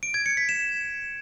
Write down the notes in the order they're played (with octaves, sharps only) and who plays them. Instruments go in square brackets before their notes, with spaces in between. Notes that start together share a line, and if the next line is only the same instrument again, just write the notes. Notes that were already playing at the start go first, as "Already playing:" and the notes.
[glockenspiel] D7
G#6
C#7
B6
E7